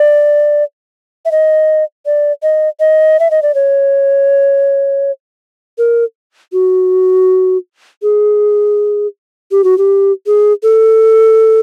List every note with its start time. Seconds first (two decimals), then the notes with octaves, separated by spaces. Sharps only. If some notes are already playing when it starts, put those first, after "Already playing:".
Already playing: D5
1.25 E5
1.32 D#5
2.06 D5
2.43 D#5
2.80 D#5
3.20 E5
3.31 D#5
3.42 D5
3.55 C#5
5.78 A#4
6.53 F#4
8.02 G#4
9.51 G4
9.64 F#4
9.78 G4
10.27 G#4
10.63 A4